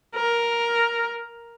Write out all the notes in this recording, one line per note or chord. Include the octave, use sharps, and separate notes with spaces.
A#4